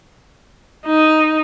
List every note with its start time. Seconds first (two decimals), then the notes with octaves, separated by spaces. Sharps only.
0.86 D#4